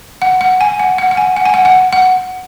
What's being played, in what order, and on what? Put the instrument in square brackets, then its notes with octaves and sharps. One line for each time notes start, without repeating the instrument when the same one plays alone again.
[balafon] F#5
F#5
G#5
F#5
F#5
F#5
G#5
F#5
G#5
F#5
F#5
F#5